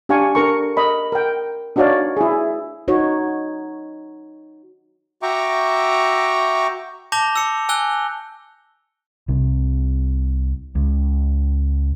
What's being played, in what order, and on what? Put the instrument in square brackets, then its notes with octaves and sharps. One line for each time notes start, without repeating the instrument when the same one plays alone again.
[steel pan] D4 G4 D5 F5 G#5 C#6
D4 A4 A#4 A#5 C#6
A#4 D#5 B5
A#4 G5
D4 D#4 F#4 C#5 D5 F5
E4 G#4
[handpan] D#4 F#4 C#5
[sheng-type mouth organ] F#4 E5 G5 A#5 C#6 D6
[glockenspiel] A5 D6 G6 A#6 F7 G7
E6 C#7
G#5 E6 F#6 G7
[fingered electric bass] C2 C3
C#2